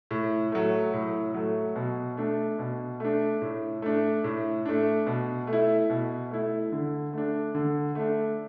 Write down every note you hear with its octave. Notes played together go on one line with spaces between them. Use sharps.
A2
F#3 A3
A2
F#3 A3
B2
A3 D4
B2
A3 D4
A2
A3 D4
A2
A3 D4
B2
A3
E4
B2
A3 E4
D3
A3 D4
D3
A3 D4